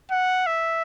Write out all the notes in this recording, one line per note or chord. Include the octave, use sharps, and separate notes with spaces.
F#5
E5